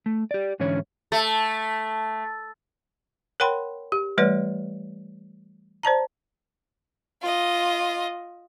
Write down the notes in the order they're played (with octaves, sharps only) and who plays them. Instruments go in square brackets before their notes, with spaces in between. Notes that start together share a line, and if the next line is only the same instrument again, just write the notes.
[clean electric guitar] A3
G4 D5
G#2 D3 E3 C#4 C#5
[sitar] A3
[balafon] A#4 C#5 F#5 G5 B5 C6
G4
E3 G3 A3 B4 C#5 D5
C5 D5 A5 A#5
[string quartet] F4 D#5